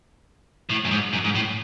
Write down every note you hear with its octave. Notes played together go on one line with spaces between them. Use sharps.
A2
F#2
G#2
F#2
G#2
A2